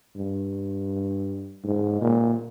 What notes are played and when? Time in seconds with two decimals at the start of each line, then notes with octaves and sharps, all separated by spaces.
0.16 G2
1.64 G#2
2.01 A#2